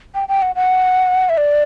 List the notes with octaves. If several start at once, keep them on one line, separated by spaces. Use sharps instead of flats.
G5
G5
F#5
F#5
E5
D5